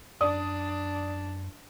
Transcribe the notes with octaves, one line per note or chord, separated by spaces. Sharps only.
F#2 D4 D5 D#6